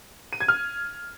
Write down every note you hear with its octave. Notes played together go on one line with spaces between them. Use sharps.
D#7
G#6
F6